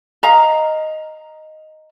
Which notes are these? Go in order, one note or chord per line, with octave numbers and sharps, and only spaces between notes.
D#5 F5 A#5